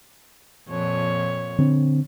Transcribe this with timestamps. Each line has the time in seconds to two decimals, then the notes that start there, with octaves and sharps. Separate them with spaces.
0.69 F2 A#2 C#5
1.58 D3 C4